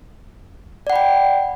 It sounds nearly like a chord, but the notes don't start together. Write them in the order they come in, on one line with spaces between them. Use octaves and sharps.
D5 F#5 B5 G5